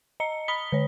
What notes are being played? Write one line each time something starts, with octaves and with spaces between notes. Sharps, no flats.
D#5 A#5 C#7
B5 D#6 B6 G7
D3 C#5